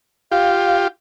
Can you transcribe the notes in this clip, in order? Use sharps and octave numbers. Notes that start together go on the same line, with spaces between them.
F4 G4 F5